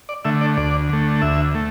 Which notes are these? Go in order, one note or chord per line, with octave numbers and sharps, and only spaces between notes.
D5
D3 A3 E5
D5
D2 D5
D3 A3
D2 E5
A3